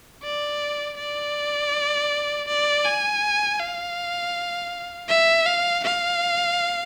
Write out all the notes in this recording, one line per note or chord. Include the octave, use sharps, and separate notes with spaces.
D5
D5
D5
G#5
F5
E5
F5
F5